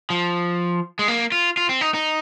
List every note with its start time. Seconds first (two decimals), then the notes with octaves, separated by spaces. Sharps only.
0.10 F3
0.99 G#3
1.08 A#3
1.32 F4
1.57 F4
1.69 C4
1.81 D#4
1.94 D#4